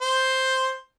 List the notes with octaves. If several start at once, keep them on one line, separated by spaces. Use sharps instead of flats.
C5